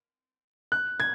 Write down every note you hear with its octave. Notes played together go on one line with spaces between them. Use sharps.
F#6
G#6